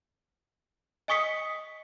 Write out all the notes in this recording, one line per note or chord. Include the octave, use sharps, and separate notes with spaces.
D#5 G#5 C#6 D#6 B6 C#7